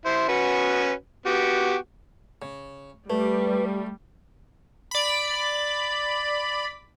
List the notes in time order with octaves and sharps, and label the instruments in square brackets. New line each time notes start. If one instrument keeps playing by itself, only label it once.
[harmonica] E4 C5
C#4 F#4 B4
B3 F#4 G4
[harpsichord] C#3
[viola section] G3 [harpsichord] A3 [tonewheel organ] B4
[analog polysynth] D5 B5